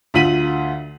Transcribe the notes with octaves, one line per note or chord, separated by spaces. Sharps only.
D2 D3 F4 B6 D#7 F#7